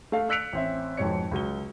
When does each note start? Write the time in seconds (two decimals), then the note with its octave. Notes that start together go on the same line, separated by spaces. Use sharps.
0.12 A3 F5
0.29 E6 F#6 B6 C#7 D7 F7
0.53 A1 C4 E5
0.97 F2 G#2 B2 C#5 C#7
1.31 C#2 F#3 G7